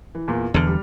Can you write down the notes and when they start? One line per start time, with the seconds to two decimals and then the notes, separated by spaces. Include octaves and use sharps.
0.15 E3
0.28 E2 A#2
0.54 E2 B2 D3 F6
0.67 G3